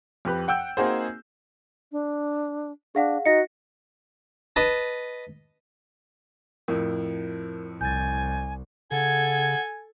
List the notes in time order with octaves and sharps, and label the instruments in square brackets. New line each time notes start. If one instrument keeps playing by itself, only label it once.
[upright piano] F2 G4 B4
F#5 G5 E6 G6
A#3 C4 D#4 F#4 G#4 C5
[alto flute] D4
[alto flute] D4 [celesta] G#4 F5 F#5
[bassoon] D#4 [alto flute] F#4 [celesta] A#6 C#7
[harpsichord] B4 D#5 A5
[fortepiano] F2 A2 [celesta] A#4
[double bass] C2 [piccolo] G#5 [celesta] G6 A6
[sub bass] C#3 [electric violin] A4 G#6 [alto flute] F#5 [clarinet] G#5